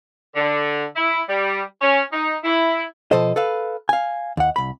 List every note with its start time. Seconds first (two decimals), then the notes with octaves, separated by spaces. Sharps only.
0.36 D3
0.96 E4
1.29 G3
1.81 C#4
2.13 D#4
2.44 E4
3.11 B2 F3 A4 C5 D#5
3.36 A4 B4 F5
3.89 F5 G#5
4.37 D#2 F#5
4.56 C2 B5